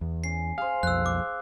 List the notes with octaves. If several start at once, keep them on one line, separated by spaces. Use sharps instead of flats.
E2
C#4 C7
G#4 C5 F5
B1 F2 E6 F#6
D6